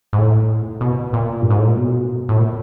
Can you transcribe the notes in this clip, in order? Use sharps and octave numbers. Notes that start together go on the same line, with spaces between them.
G#2
A2
B2
A#2
G2
G#2
A2
A#2
B2
A2
A#2